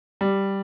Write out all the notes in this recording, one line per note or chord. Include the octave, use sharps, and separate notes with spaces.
G3